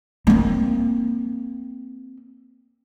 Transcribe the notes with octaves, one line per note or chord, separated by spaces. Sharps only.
A#3 C4